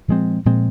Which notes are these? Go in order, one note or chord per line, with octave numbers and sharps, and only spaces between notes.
A#2 F3 G#3 C4
A#2 F3 G#3 C4